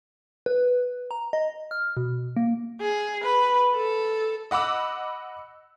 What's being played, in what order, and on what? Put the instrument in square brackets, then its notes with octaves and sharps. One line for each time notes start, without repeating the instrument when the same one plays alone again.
[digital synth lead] B4
A#5
D#5
F6
B2
A#3
[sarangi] G#4
B4
A4
[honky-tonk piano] D#5 F#5 B5 D6 E6